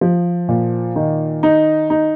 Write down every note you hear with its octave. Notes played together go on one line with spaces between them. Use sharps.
F3
A#2
D#3
D#4
D#4